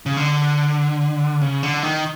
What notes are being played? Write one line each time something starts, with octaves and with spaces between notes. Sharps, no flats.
C#3
D3
C#3
D3
D#3